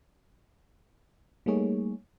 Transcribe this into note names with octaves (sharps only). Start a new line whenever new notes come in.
G3 A3 A#3 D#4 G#4 C#5